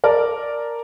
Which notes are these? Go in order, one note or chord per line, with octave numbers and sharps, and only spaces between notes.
A#4 D5 A5